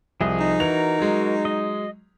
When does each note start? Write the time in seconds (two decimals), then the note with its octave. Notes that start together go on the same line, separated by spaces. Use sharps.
0.21 C2 F3 G#4 D#5
0.40 D#4
0.60 E3 F#4 A#4 F7
0.99 F#3 G#3
1.45 D#5